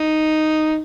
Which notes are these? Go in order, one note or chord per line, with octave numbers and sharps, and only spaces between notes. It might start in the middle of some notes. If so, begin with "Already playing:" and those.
Already playing: D#4